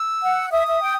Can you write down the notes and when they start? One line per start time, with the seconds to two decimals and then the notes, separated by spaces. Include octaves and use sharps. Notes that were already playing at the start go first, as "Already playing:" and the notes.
Already playing: E6
0.23 F#5
0.52 E5 D#6
0.67 E5
0.81 G5